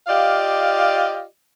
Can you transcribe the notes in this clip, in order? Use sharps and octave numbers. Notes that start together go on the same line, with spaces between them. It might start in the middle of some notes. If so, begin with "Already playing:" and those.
F4 G4 D5 D#5 F5